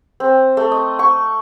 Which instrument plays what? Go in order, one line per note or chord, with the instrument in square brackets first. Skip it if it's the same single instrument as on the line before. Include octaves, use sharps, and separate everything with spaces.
[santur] C4
A3
D#5
C#6